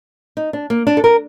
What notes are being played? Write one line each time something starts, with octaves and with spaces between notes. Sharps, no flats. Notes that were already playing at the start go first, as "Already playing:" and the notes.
D#4
D4
A#3
D4
A4
A#4